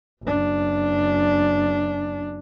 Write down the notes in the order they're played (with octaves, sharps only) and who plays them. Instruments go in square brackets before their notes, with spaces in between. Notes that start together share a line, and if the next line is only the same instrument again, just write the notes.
[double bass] F#1 D4